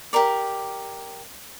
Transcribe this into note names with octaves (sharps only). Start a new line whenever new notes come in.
G4 A#4 D5